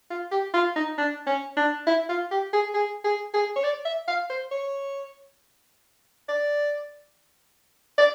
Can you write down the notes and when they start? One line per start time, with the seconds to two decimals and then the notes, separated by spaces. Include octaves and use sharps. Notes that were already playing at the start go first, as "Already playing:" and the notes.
0.10 F4
0.31 G4
0.54 F4
0.76 D#4
0.98 D4
1.27 C#4
1.57 D4
1.87 E4
2.09 F4
2.31 G4
2.53 G#4
2.74 G#4
3.04 G#4
3.34 G#4
3.56 C#5
3.64 D5
3.85 E5
4.08 F5
4.30 C5
4.51 C#5
6.29 D5
7.98 D5